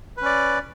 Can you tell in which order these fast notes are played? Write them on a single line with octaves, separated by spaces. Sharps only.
B4 C#4 D5